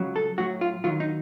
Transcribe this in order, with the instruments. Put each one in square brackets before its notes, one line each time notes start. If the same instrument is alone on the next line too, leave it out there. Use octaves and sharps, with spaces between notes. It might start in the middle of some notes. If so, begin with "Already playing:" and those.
Already playing: [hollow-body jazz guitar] C#2 C#3 F#3
A4
A2 F#3 F#4
F4
D#2 D#3 F#3 F4
D#4